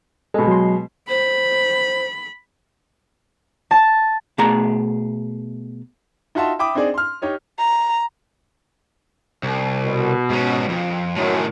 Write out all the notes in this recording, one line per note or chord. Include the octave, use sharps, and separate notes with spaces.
B2 G#3 A4
F#3 C6
C5 B5
A5
B2 A3 G#4 A5 A#5
D#4 F4 F#4 E5 A5 C6
E5 G5 B5 D6 D#6
C4 D4 D#4 G#4 D5
C6 F6
D#4 G4 C#5 D#5
A#5
C2
B2
G#2 C#4
F2
F#2 A2 D#3